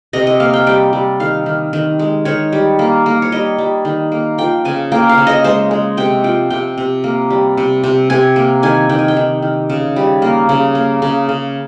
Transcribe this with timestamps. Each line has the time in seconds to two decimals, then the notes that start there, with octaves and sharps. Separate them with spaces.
0.13 C3 D#5
0.27 D#5
0.40 A#3 F5
0.54 G5
0.67 G3 G5
0.93 G3
1.20 D#3 F5
1.46 D#3
1.73 D#3
1.99 G#3
2.25 D#3 C#5
2.52 G3
2.79 A#3
3.06 A#3
3.22 C#5
3.32 G3 D#5
3.58 G3
3.85 D#3
4.12 A#3
4.38 F3 G5
4.65 C#3 G#5
4.92 A#3 G5
5.09 F5
5.17 C#3
5.27 D#5
5.44 G#3 C5
5.71 G#3
5.97 C3 G5
6.24 F3 G5
6.50 C3 G5
6.78 C3
7.04 A#3
7.30 G3
7.57 C3
7.84 C3
8.10 C3 G#5
8.36 A#3
8.63 D#3 G#5
8.89 D#3 G5
8.99 G#5
9.08 G5
9.17 D#3
9.42 D#3
9.70 C#3
9.96 G3
10.22 A#3
10.49 C#3
10.75 A#3
11.02 C#3
11.29 C#3